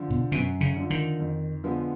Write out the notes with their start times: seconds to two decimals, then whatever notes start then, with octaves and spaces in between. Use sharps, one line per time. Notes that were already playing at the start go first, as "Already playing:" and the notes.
Already playing: D3 F3
0.10 B2
0.32 F#2 B2
0.61 C#3
0.76 D3 F3
0.90 D#3
1.20 F2
1.64 D3 F3 G#3 B3